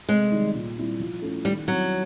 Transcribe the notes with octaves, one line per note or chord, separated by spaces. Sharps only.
C3 G#3
D#3 G3
A#2
G3 C4 E4
F3
A3 C#4 E4
D#3 G3
F#3 G3 C4 E4